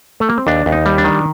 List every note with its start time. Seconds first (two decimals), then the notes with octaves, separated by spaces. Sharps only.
0.20 A3
0.29 A#3
0.38 C4
0.47 D#2 D4
0.66 D#2
0.72 D#4
0.86 G3
0.98 D4
1.04 D#3